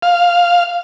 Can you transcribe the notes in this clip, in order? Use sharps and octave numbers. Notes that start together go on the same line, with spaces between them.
F5